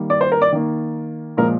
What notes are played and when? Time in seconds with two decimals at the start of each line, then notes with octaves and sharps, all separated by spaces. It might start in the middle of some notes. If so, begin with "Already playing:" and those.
Already playing: D#3 G3 A#3
0.10 D5
0.21 C5
0.32 A#4
0.42 D5
0.52 D#3 A#3
1.37 A#2 F3 G#3 A#4